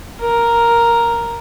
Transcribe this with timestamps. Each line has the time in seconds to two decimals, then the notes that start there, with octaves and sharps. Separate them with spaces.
0.21 A#4